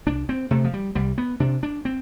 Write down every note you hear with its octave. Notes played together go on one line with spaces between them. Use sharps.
C2 D4
C4
C3 A3
F3
G3
C2 G3
B3
C3 D4
D4
C4